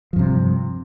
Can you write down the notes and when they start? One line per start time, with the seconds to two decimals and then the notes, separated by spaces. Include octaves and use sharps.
0.13 F3
0.16 G2
0.19 C3